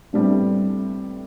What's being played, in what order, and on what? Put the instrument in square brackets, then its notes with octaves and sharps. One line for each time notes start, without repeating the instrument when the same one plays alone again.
[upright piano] A2 G3 A3 B3 C4 D4